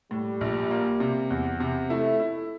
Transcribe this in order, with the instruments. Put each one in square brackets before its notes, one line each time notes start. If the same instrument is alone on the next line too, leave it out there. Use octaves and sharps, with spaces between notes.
[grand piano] A2 [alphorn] G3
[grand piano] A#1
A#3
C3
E2
C3
[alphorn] A3 [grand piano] E4
[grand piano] E4